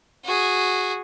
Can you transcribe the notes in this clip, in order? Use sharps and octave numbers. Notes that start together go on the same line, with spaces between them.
F#4 G#4